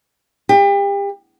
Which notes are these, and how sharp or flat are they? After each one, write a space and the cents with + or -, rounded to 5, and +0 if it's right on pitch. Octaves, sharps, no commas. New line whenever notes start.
G4 +35